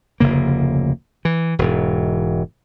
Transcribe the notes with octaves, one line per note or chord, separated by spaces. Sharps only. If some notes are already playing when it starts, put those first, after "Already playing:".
F1 D2 C#3 A#3
E3
E1 G#2